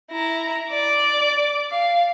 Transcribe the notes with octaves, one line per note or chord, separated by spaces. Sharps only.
E4 A#5
D5 D6
F5